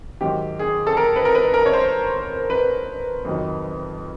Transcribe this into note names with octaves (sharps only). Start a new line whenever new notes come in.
G#2 D#3 F#3 G4
G#4
A4
A#4
B4
A#4
B4
A#4
C#5
C5
B4
F2 C3 D#3 F#3